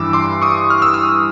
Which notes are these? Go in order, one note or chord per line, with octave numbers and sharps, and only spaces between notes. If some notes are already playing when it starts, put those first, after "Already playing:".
Already playing: G2 E3 G3 D6 E6
C6 D6
C#6 D#6
F6
E6
D#6 F6